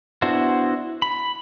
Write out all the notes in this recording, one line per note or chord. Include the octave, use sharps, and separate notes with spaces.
B3 D4 E4 F#4 C5
B5